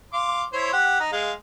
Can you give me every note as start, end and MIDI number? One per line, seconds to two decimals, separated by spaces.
0.13 0.43 77
0.13 0.43 84
0.13 0.43 86
0.53 0.71 64
0.53 0.71 72
0.53 0.71 73
0.73 0.99 67
0.73 0.99 78
1.00 1.09 63
1.12 1.32 56
1.12 1.32 77